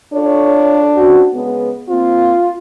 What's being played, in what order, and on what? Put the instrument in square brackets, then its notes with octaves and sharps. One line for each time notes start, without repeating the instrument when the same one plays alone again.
[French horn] D4 [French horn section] F4 A4 C#5
[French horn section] C4 C#4 F#4
C#3 G#3 B3
[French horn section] A#3 C4 [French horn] F4